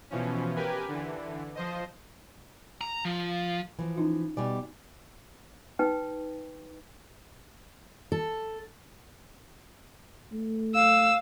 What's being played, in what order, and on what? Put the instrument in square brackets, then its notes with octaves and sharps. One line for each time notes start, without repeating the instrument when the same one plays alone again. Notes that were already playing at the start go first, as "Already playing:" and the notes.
[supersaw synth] B2 E3 F3 C#4
G4 A#4 B4 G#5
D3 E3
F3 C5 D#5
[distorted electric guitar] A#5
F3
[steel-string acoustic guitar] E3 F3
[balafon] C#4 D#4 F4
[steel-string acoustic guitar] B2 G3 D5 [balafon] G#5
[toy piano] D#4 B4 G5
[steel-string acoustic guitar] A4
[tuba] A3
[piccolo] F5 [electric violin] E6